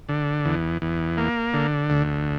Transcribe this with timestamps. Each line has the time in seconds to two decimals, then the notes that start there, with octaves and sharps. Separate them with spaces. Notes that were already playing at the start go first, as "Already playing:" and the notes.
0.09 D3
0.45 E2
0.82 E2
1.18 A#3
1.53 D3
1.90 D2